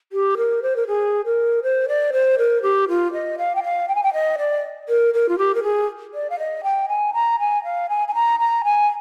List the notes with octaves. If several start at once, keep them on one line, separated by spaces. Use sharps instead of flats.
G4
A#4
C5
A#4
G#4
A#4
C5
D5
C5
A#4
G4
F4
D#5
F5
G5
F5
G5
G#5
G5
D#5
D5
A#4
A#4
F4
G4
A#4
G#4
D5
F5
D#5
G5
G#5
A#5
G#5
F5
G#5
G#5
A#5
A#5
G#5